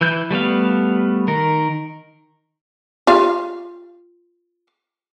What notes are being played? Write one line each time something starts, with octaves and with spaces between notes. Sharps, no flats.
E3 E4 G6
G3 A3 B3 F5
D#3 A#4
F4 G4 F5